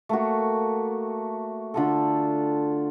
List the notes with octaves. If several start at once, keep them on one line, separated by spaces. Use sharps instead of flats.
A3 A#3 F#4
D3 F4 A4